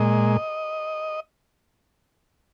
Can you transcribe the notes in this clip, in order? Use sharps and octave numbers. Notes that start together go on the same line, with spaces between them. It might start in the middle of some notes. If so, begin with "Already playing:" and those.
Already playing: A#2 G#3 D#5